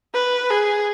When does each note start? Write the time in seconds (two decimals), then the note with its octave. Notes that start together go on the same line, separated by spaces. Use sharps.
0.14 B4
0.50 G#4